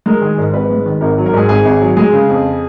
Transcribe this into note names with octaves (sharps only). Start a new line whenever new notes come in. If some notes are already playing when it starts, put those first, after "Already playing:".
G#3 A#4
D#3 G#4
G#2 A#4
G#1 B4
G#3
D#3
G#1 A#4
F#3
A#4
G#2 G#4
G#1 G#4
G#1
F#3
G#3 G#4
C#3
F2